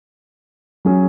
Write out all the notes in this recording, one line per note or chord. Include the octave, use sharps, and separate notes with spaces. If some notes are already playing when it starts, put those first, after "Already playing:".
F#3 C#4 G#4